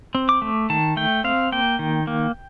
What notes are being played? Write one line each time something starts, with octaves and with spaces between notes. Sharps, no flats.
C4
D6
A3
D#3 A5
A3 G5
C4 F5
A#3 G5
D#3
A#3